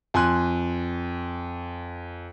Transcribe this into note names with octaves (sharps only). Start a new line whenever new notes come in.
F2 G#5 C6 F#6